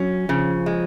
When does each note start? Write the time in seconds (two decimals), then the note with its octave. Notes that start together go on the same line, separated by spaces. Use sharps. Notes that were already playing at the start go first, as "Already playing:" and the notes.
Already playing: F#3 C#4
0.29 C#3 F3
0.66 G#3